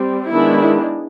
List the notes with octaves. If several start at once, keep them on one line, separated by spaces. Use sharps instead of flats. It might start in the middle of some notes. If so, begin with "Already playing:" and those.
Already playing: G3 C4
D#3 G#3 B3 D4 E4